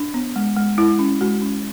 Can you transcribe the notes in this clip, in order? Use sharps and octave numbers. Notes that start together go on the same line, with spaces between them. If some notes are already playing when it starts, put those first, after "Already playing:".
Already playing: D4
B3
G#3
G#3
G#3 E4
C#4
G#3 F#4
C#4